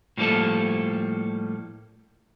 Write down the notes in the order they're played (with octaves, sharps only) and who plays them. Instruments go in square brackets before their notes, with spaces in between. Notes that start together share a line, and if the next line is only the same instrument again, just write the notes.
[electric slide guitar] A2 E3 F3 G3 A#3 A4